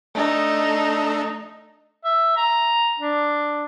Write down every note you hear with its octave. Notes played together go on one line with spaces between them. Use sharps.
A3 D4 D#4 A4
E5
A#5
D4